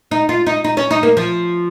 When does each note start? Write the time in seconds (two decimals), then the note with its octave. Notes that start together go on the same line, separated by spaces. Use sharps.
0.11 D#4
0.29 F4
0.46 D#4
0.64 D#4
0.77 C#4
0.91 D#4
1.03 A#3
1.17 F3